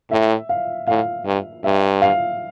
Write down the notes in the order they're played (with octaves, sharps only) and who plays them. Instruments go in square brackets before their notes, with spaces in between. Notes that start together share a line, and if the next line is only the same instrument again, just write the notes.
[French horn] A2 [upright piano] E5
[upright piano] F5
[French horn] A2 [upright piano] F5
[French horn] G2
[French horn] G2 [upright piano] E5
[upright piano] F5